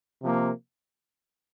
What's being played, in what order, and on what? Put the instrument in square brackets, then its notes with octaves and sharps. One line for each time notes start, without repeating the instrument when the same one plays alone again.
[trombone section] C3 F3 A#3